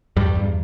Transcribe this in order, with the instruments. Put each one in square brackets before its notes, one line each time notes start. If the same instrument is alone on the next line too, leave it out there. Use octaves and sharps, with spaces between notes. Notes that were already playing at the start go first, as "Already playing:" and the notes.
[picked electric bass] E2 G2 G3
E2